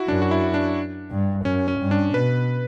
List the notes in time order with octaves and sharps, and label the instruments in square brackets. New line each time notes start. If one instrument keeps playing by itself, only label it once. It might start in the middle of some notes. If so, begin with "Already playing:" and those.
Already playing: [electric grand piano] E4 F#4
[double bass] F#2 [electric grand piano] D4
[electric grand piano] F#4
E4
D4
[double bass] G2
[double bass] F#2 [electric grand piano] C#4
[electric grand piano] C#4
[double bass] G2
[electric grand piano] D4
[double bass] B2 [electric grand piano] B4